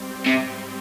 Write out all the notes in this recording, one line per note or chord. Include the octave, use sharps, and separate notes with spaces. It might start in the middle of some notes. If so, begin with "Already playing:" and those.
Already playing: G#2 G3 C4
C3